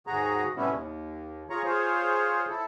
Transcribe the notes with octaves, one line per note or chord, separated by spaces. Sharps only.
D#2 G#2 F#4 G#4 A#5
A2 C3 G3 B3 C#4 E4
D#2
F4 G#4 C#5 A#5 C#6
F4 G#4 C5 C#5
E4 A4